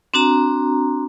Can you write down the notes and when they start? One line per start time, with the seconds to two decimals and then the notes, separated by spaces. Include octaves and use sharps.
0.14 C4 D4 F#4 A#5